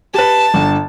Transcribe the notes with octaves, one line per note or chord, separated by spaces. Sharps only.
G4 B4 A5
G1 D3